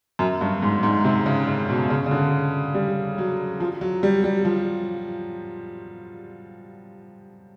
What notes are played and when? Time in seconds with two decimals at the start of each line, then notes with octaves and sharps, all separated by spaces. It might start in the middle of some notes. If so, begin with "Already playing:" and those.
0.19 F#2
0.41 G2
0.62 G#2
0.83 G#2
1.05 C3
1.26 C#3
1.47 C#3
1.69 B2
1.90 C#3
2.06 C#3
2.11 D3
2.75 G3
3.18 F#3
3.60 F3
3.81 F#3
4.03 G3
4.24 G3
4.45 F3